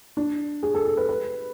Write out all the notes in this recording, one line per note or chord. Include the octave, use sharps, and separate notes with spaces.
D4
G#4
A4
A4
B4
B4